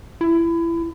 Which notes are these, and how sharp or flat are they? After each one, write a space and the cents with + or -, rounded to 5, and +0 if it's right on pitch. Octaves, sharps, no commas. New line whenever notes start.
E4 +25